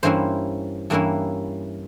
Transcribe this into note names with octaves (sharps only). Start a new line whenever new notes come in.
G2 E3 A#3 C#4 E4 C5
G2 E3 A#3 C#4 E4